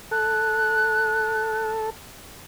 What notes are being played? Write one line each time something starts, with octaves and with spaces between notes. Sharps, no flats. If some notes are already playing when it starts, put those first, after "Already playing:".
A4 F#6